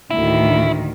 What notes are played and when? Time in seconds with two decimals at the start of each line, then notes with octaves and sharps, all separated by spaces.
0.11 D2 A2 D#3 E4